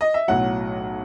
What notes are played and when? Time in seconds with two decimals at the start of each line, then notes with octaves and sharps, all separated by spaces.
0.01 D#5
0.14 E5
0.28 B1 A2 F#3 F#5